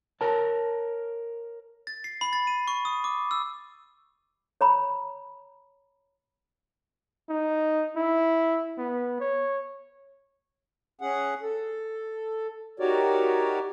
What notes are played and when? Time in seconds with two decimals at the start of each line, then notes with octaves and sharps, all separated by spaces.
0.21 A#4 C#5 A5
1.87 A6
2.04 C7
2.21 B5
2.33 A6
2.47 D#7
2.68 C#6
2.85 D#6
3.04 D6
3.31 E6
4.61 C#5 A#5 B5
7.30 D#4
7.96 E4
8.78 B3
9.20 C#5
11.01 C#4 G#4 F#5
11.42 A4
12.80 D#4 F#4 G4 A#4 C#5 D5